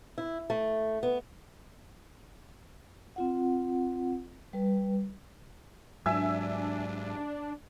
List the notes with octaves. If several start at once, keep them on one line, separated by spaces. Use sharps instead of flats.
E4
A3
B3
C4 F4 F#5
G3 B4
G#2 F#3 D4 E5 G#5 E6